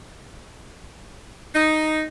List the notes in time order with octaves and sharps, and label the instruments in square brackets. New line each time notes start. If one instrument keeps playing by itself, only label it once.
[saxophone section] D#4